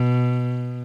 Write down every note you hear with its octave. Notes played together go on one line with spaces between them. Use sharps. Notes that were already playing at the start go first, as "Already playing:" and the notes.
Already playing: B2